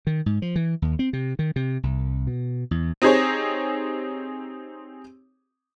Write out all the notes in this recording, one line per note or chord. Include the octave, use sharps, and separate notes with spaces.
D#3
G#2
F3
E3
D#2
C4
C3
D#3
C3
C2
B2
E2
C4 D#4 G4 G#4 C5 C#5